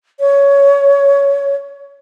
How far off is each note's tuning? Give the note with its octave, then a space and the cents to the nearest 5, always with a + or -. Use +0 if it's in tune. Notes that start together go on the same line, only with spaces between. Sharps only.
C#5 +15